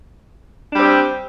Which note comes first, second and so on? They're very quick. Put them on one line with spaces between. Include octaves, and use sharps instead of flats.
D4 G3 C4 G4